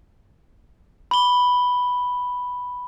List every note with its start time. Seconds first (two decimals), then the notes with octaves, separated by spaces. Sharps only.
1.11 B5 G7